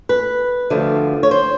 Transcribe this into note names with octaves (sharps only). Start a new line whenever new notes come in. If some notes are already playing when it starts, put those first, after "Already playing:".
B4
D2 D3 F3 A3
C#5
C5